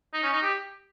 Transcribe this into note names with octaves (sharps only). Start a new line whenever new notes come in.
D#4
C#4
D#4
G4